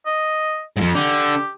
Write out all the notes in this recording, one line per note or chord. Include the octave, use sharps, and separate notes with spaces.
D#5
F2 G#2
D3 G4